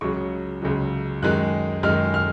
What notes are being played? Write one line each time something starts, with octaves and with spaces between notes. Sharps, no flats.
C#2 C#3 F#3 C#6
C#2 C#3 F#3
F#2 D#3 G#3 F#6
F#2 D#3 G#3 F6
F6